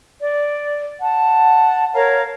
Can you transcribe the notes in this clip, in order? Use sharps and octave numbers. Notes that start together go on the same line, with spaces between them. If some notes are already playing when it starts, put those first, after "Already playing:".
D5
F#5 A5
A#4 C#5 F5 A#5